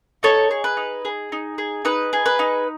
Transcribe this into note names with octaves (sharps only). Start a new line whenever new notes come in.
D#4 A4 C#5
G#4
B4
D#4
G#4
D#4
G#4
D#4 B4
G#4
B4
D#4